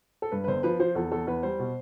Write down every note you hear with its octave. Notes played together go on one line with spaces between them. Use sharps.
A4
G2 B4
B4
G1 C5
F3 B4
F3 C5
E2 A4
E2 A4
E2 B4
G3 C5
B2